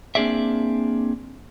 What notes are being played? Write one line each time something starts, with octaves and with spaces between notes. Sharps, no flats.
A#3 C4 D4 G#4 D5 E5